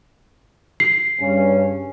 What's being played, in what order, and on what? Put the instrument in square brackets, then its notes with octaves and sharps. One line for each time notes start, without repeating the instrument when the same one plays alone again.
[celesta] C7
[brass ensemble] G2 C#3 C#4